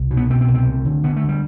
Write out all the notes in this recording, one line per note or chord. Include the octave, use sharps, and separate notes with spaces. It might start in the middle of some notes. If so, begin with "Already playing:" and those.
Already playing: C2
B2
B3
B2 C4
C4
C2
C4
D2
D3
D3 B3
A3
D2
G3